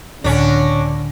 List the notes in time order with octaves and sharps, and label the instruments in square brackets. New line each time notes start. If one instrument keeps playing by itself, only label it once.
[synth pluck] C#2 A2 A#6 [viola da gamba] D3 [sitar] C#4 D4